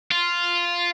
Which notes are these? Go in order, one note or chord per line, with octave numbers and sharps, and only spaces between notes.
F4